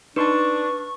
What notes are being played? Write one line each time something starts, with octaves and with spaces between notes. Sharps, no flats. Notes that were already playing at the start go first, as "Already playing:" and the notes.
D4 D#4 B4 A5 C6 C#6